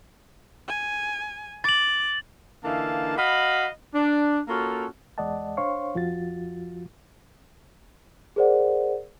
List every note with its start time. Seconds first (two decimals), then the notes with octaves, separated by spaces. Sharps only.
0.68 G#5
1.64 D6 A6 F#7
2.64 D3 E3 A#3 D#4 F5 A5
3.18 F#4 D#5 F5 B5
3.94 D4
4.48 A#3 C#4 F4 F#4 A4 A#4
5.18 E2 G#3 D5 D#5 F#5 A5
5.57 D4 C5 C#5 F5 C6 C#6
5.95 F2 F3 F4 F#4 A6
8.36 G#4 A#4 C5 D5 F#5